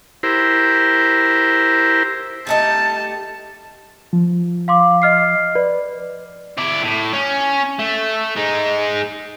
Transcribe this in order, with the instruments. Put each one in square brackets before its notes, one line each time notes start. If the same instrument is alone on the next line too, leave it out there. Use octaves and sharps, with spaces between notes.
[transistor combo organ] E4 G4 A#4 C5
[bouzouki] G3 A3 D#4 [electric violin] A5
[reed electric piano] F3
[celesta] F5 C6 D6
D#5 F6 C7
[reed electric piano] B4 [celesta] D5
[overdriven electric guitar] E4 D5
A2
C#4
A3
G#3 D#4